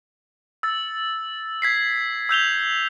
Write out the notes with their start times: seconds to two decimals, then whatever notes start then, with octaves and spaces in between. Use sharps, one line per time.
0.63 E6 A6
1.62 G#6 B6 C7
2.29 E6 G6 F7 G7